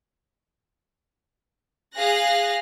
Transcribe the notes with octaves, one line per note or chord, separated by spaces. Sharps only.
G#4 F5 F#6 A#6